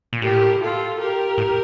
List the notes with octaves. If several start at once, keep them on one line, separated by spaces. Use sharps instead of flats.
A#2
A2 G4 A#4
F4 A4
G4 A#4
A2